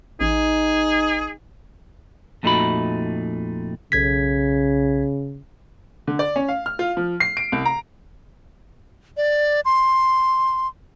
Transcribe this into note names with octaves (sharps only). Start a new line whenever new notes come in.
A1 D#4 G#4
F2 A#2 A3 D#4 F#4 B5
B1 C#3 G#6 B6
D3
D5
C#4
F5
F6
F4
F3
C7
D7
C2
A#5
D5
C6